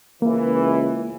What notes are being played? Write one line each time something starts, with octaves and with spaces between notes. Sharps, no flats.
C#2 E3 A#3